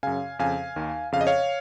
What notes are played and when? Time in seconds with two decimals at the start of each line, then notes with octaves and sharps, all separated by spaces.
0.03 F#2 C#3 F5 G#5
0.39 F2 C#3 F5 G#5
0.76 D#2 D#3
1.12 F2 C#3 F5
1.21 D#5
1.27 C#5 F5